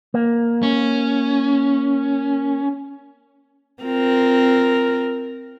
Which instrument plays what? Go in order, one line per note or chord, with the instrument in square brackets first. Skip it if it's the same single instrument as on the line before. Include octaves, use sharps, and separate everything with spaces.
[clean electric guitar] A#3
[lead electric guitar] C#4
[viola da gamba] C4 F4 A#4